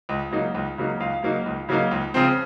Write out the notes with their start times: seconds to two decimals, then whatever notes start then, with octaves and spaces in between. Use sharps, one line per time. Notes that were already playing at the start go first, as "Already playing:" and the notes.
0.09 C#2
0.31 C#3 F#3 A#3 D#4
0.55 C#2
0.78 C#3 F#3 A#3 D#4
1.00 C#2 F5
1.23 C#3 F#3 A#3 D#4
1.46 C#2
1.69 C#3 F#3 A#3 D#4
1.91 C#2
2.14 C#3 F3 C4